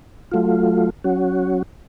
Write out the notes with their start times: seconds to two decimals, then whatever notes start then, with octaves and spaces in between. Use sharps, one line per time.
0.32 F#3 A3 F4
1.04 F#3 C#4 F#4